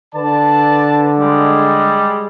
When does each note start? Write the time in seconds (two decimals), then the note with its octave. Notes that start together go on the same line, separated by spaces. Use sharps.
0.15 D3 B4 D5 A5
1.19 G3 G#3